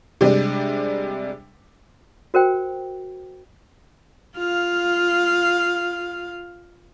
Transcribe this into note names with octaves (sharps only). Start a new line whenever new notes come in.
C3 G3 G#3 D4
F#4 A#4 C5 G5
F4 F5